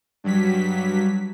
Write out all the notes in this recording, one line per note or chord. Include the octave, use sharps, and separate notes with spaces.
G2 F#3 B6